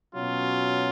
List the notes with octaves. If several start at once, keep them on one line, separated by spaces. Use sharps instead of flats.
B2 F#3 C#4 F4